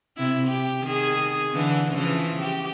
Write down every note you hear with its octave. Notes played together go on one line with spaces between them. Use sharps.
C3 E4
G4
D#3 G#4
D3 E3
C#3 E3 F3
G4